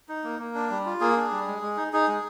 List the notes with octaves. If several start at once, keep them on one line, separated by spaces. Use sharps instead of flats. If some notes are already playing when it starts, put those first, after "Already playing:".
D#4
A#3
A#3
D4
G3
F4
A#3 G#4
D4
G3
G#3
G#3
D#4
D#4 G#4
G#3